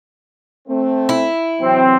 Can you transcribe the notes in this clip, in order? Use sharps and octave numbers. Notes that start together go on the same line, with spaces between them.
A3 C4
E4
C3 E3 F#3 C4